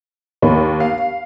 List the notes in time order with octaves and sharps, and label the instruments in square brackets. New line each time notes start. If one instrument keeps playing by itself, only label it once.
[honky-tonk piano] D#2 [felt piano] C#5 B5
[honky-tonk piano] F5